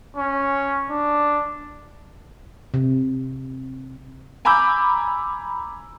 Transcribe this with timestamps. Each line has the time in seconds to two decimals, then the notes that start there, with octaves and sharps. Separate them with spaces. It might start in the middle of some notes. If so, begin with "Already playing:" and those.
0.17 C#4
0.90 D4
2.74 C3
4.45 G#5 A#5 B5 D6 E6 G6